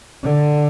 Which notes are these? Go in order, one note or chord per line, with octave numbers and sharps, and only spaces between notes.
D3